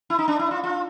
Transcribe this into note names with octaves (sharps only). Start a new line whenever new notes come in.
E4
D#4
D4
E4
F4
F4